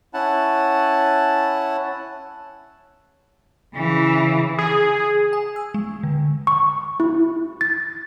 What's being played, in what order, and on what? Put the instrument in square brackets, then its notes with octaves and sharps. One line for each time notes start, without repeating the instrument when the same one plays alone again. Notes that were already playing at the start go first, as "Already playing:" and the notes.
[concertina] C#4 E4 F#5 A5
[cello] C#3 E3
[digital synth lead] G#4
[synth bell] G#5
E6
G#3
D3
[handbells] C#6
E4
A6